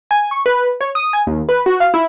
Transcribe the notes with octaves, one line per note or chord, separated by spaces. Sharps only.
G#5
C#6
B4
C#5
D#6
G#5
D#2
B4
F#4
F5
E4